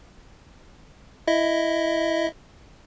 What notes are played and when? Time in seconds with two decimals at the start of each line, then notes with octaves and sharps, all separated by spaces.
1.27 E4 D#5 E5